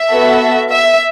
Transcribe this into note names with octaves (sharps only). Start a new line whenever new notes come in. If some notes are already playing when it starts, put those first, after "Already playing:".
Already playing: E5
B3 F#4 A4
E5